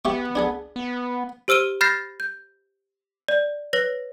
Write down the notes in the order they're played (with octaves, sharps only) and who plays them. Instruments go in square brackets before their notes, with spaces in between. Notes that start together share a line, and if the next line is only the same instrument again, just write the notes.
[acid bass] B3 [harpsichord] G4 E5 C#6
[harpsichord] D4 G#4 A4
[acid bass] B3
[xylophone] G4 C5 E6 F6 D#7 G7
B5 F6 G6 A6 A#6 C7
G6
D5
B4 C#5 A#6